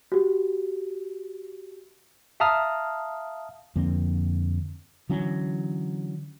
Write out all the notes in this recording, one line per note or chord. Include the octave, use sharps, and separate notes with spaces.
F#4 G4
E5 F5 A5 A#5 D#6 F6
F2 D3 A#3 C4
D3 E3 F#3 C#4